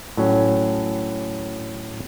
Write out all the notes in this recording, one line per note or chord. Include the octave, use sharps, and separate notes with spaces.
A2 F#3 C#4